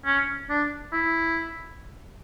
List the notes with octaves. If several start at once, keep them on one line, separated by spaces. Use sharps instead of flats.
C#4
D4
E4